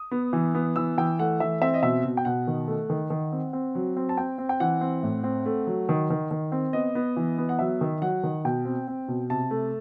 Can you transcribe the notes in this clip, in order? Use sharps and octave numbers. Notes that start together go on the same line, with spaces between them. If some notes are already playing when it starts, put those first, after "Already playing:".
Already playing: D#6
B3
E3
B3
E3 E6
E3 G5
A3 F#5
E3 E5
C4 E5
D#5
B2 E5
B2
G5
B2 F#5
D#3
A3
D#3
D#3
C4
C4
F#3
C4
A5
C4 G5
C4
G5
E3 F#5
C4
A2
C4
A3
F#3
D#3
D#3
D#3
C4
B3 D#5
B3
E3
B3
F#5
F#3 E5
D#3
F#3 F#5
D#3
B2 G5
C4
C4
B2
C3 A5
A3